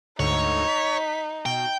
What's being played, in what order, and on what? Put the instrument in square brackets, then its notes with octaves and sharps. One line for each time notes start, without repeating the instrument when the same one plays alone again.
[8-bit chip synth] D2 G#2 D3 [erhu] D#4 [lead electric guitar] C#5
[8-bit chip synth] B6
[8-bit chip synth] B2 [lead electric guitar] G5